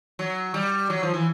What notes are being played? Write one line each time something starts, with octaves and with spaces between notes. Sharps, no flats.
F#3
G3
F#3
F3
E3